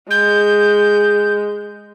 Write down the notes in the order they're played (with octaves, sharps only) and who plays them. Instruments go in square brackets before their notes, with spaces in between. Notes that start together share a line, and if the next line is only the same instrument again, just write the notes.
[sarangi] G#3 [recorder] G6